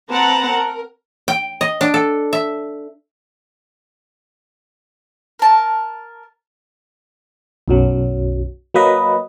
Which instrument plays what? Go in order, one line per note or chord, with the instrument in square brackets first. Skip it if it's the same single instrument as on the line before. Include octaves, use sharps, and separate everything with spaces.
[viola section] C4 B4 F#5 A5 A#5
A#4
[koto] G5
D#5
D4
A4
E5
[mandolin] A#4 A5
[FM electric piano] B1 F#2 F#3
F#3 A#3 B4 D#5